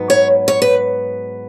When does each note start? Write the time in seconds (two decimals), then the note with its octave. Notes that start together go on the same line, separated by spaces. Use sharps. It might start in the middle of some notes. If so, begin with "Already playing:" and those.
Already playing: G#2 F#3 B3
0.10 C#5
0.48 C#5
0.62 B4